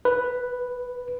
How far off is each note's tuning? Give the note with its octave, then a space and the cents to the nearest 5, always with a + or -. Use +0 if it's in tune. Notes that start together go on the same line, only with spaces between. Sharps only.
B4 +0